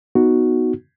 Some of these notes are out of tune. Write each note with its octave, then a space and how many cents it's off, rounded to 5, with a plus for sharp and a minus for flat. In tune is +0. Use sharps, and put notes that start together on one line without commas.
B3 +0 D#4 +0 F#4 +0